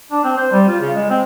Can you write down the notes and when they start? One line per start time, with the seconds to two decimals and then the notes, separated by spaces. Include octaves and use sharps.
0.12 D4
0.24 C4
0.37 C5
0.52 G3
0.68 F4
0.80 C#3
0.95 G#3
1.10 C4